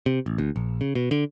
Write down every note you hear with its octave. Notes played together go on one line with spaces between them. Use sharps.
C3
A1
D2
A#1
C#3
B2
D3